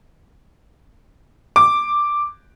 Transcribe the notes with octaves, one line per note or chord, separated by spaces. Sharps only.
D6